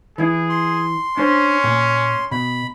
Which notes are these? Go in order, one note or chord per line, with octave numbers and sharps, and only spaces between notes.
E3 E4 G#4
C6
C#4 D4 C5
A#2
B2 B5